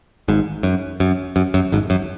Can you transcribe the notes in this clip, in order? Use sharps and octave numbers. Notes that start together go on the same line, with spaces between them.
G#1 G#2
F#2
F#2
F#2
F#2
G#1 G#2
F#2